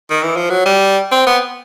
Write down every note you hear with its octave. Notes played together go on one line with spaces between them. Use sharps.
D#3
E3
F3
F#3
G3
C4
B3